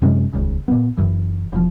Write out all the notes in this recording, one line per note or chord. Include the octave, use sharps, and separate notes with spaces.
F#2 C3 G#3 C#4
D#1 C#2 C#3
A#2 B3
F#1 F#2 E3
E1 A2 F3